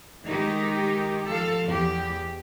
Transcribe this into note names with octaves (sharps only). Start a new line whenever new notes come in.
D#3 G#3 D#4 G4
F3 A4 F5
E2 G4